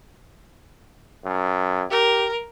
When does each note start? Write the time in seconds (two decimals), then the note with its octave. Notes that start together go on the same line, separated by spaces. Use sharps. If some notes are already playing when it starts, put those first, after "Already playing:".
1.25 F#2
1.91 G4 A#4